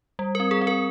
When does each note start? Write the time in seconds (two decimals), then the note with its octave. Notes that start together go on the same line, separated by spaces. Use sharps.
0.19 G3
0.35 C4 A#4
0.51 G#4
0.62 C4
0.67 A#4